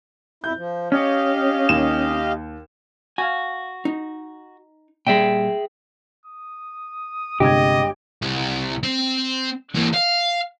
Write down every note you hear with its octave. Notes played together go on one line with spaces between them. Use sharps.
F2 E4 G6
F3
C#4 G4 D#5 F5
D#2 E7
F#4 F5 G#5
D#4
A#2 G3 G#4 E5 G5
D#6
G1 C3 G#3 G4 D#5 G#6
C2
C4
E3 A#3
F5